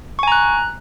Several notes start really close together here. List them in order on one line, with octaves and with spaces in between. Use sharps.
C#6 G#5 A#5 F#6